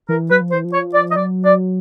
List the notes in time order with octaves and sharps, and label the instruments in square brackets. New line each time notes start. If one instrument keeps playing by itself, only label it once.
[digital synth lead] E3 [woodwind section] A#4
[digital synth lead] F#3 [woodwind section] B4
[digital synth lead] F3
[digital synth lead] E3 [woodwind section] C5
[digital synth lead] F3
[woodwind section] C#5
D5
D#5
[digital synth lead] F#3 [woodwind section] D5
[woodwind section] D5